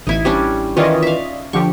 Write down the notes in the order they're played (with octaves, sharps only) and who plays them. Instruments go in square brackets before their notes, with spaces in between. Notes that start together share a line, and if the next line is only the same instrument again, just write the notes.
[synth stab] A1 [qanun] D#4 E4 G#5
[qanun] G3 C#4 D4
[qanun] D#3 E3 C#4 [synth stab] F4 D5 D#5
[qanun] E5 F5
[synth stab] D3 F3 G4 [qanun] C#6